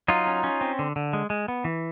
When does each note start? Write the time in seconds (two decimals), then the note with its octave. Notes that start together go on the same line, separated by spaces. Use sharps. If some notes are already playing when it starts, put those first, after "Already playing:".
0.08 F#3 D#4 F4
0.27 C#4
0.44 C#4
0.61 C4
0.79 D3
0.96 D3
1.13 G#3
1.30 G#3
1.48 B3
1.65 E3